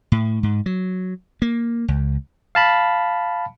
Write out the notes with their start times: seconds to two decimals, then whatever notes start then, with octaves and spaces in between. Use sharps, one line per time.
0.12 A2
0.43 G#2
0.66 F#3
1.42 A#3
1.88 C#2
2.55 F5 A5 B5